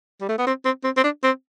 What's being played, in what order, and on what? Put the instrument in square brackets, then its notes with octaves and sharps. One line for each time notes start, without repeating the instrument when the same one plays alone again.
[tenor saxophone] G3
A3
B3
C4
C4
C4
C4
D4
C4